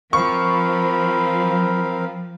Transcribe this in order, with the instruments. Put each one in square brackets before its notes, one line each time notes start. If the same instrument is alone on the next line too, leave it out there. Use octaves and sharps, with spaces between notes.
[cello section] F3 [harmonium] C4 A#4 F5 [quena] B5 [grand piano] C#6